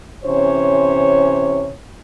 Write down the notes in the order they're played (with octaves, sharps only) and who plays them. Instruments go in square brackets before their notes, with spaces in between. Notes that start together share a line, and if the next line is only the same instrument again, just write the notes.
[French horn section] C3 E3 C#4 C5 C#5